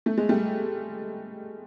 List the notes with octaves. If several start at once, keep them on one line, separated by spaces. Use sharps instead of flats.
A3
G#3
G3 A3